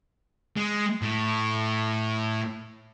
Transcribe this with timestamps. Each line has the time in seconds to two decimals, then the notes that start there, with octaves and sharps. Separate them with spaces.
0.56 G#3
1.02 A2